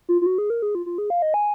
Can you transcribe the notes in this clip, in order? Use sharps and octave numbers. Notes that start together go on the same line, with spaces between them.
F4
F4
F#4
G#4
A#4
G#4
F4
F4
G#4
F5
D#5
G#5